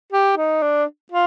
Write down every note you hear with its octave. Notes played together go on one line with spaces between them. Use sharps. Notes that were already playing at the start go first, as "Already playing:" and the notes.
G4
D#4
D4
F4